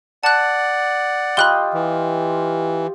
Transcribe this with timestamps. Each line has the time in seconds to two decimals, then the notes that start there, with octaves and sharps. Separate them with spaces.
0.23 D5 F#5 A5 F#6
1.37 F4 G4 D#5 B5 F#6 G7
1.73 E3